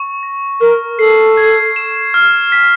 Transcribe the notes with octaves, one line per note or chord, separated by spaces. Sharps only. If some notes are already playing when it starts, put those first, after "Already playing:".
Already playing: C#6
A#6
A#4 F6
A4 C7
G#6
E7
F6
B6